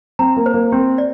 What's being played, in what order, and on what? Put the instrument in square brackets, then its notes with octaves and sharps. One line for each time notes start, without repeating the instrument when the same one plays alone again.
[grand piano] C4 [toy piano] A#5
[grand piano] A#3
[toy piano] C5
[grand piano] A#3
[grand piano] C4 [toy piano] G4
[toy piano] D5